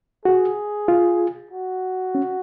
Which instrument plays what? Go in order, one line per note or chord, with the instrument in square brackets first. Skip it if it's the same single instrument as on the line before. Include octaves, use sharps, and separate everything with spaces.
[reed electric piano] F#4 [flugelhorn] G#4
[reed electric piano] F4
[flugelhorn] F#4
[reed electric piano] C#4